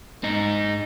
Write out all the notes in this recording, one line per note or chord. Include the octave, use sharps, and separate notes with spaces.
G#2 D#4